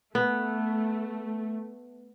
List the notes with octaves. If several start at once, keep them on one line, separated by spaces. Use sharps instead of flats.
A3 B3